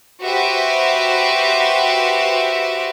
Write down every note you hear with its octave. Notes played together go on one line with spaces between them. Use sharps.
F#4 G4 B4 C5 E5